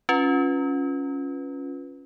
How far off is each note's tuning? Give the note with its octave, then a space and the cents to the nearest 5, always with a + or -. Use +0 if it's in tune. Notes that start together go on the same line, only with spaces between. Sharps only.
C#4 +0 F4 +0 B4 +0